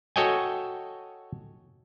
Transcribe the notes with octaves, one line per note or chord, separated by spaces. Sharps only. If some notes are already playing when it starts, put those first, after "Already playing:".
F#4 A4 C#5 D#5 G5 G#5